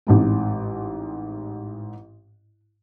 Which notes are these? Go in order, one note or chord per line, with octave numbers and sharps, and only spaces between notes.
A1 G#2 C4